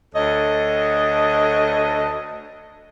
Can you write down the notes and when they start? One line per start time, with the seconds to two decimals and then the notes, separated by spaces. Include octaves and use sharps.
0.14 D2 A4 C#5 D#5